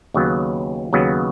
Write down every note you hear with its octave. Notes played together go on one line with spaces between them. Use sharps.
D#2 C#3 F#3 B3
D#2 C#3 F#3 B3